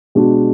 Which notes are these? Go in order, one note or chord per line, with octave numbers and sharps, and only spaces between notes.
B2 G#3 D4 F#4